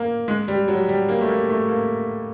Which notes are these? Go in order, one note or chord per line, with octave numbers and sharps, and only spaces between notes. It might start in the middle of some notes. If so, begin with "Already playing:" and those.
Already playing: A#3
G#3
G3
F#3
G3
A#3
A3
A#3
A3
A#3